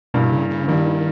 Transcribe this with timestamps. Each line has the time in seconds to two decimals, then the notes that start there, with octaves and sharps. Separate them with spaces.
0.14 G2 B2 G3 A#3 E4
0.32 C#3
0.50 C#3
0.68 G2 D#3 G3 A#3 E4